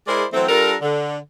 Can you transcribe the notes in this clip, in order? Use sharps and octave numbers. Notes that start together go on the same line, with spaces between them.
G#3 E4 G#4 A#4 C5 D5
E3 F#3 A3 C4
G3 D4 F4 A4 A#4
D3